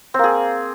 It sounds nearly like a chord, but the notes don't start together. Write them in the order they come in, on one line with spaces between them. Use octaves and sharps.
C4 A#3 G#4